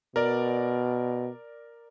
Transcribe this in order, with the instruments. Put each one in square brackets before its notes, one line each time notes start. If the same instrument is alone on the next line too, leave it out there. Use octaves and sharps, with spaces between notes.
[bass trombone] B2 [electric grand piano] A#4 D5